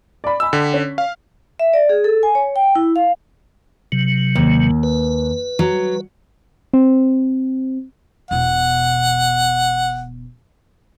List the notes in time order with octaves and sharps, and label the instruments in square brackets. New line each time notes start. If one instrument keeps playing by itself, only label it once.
[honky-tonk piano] D5 B5
[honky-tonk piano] D#5 G#5 B5 [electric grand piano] E6
[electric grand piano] D3 [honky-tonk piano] G5 B6
[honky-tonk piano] C#4
[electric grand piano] F5
[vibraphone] E5
D5
G#4
A4
G#5
C#5
G5
E4
F5
[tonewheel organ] C3 F#3
[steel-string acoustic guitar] D#2
[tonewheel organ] B4
[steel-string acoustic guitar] F#3
[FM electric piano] C4
[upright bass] E1 B2 [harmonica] F#5